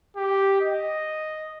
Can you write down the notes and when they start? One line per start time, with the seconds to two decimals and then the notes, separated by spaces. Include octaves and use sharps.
0.16 G4
0.61 D#5